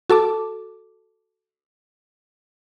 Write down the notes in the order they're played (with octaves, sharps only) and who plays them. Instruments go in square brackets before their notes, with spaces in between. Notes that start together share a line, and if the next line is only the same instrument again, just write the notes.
[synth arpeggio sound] F#4 A4 A5 D6